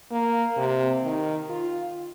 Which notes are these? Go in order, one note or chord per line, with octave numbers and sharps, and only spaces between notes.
A#3
C3
D#3
F4